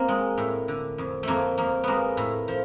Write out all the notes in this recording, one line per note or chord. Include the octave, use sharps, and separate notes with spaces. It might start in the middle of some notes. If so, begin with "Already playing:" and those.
Already playing: A#3 C4
G#3
A2
D3
F2
F2 A3 A#3
F2 A#3
G#3 A#3 B3
A2
F3